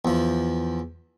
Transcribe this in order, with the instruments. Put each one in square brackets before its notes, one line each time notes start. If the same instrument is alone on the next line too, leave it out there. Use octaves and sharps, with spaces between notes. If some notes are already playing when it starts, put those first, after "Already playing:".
[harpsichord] E2 F3